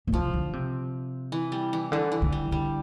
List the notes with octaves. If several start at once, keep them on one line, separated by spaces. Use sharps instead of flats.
A#2
C3 F3
D3
C3
E3
G3
E3
D3 E3
E3
D3
G3
D3 G3